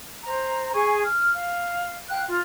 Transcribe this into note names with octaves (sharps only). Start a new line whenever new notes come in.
C5 A#5
G#4 G#5 C#6
F6
F5
F5 G5 F#6
F4